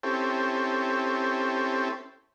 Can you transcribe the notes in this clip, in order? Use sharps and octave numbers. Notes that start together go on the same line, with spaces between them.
C4 C#4 E4 G4 A4